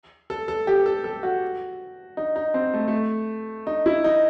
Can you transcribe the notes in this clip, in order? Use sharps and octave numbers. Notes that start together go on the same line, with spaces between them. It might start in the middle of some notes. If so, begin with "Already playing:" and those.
A4
A4
G4
A4
A4
F#4
D#4
D#4
C4
A3
A3
D#4
E4
D#4